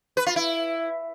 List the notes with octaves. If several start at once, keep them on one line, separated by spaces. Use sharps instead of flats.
B4
F4
E4